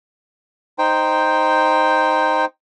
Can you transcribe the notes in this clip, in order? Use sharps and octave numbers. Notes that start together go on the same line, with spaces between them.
D#4 C5 G5